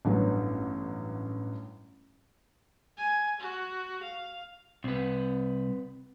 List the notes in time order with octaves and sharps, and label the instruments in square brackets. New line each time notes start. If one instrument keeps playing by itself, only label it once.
[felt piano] A1 G2 F#3 B3
[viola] G#5
F#4
F5
[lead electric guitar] C2 [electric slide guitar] C4 B4